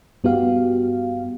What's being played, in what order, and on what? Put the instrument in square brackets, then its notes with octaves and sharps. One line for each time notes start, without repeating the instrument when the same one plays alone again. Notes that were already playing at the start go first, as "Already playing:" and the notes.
[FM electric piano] G2 B3 F#4 G4 F5